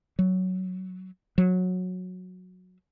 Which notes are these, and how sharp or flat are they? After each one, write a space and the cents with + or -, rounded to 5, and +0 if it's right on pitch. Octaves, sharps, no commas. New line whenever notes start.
F#3 +5
F#3 -15